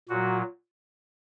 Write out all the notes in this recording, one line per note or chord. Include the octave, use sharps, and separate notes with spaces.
A#2 F#3 F#4